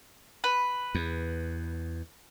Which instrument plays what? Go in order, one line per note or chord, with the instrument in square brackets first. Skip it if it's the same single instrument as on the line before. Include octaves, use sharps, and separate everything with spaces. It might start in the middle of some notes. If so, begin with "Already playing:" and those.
[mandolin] B4
[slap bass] E2